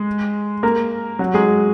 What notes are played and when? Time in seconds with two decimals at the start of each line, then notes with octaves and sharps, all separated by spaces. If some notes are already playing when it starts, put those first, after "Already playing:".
Already playing: G#3
0.63 A#3 A#4
1.19 F#3 F#4
1.34 G#3 G#4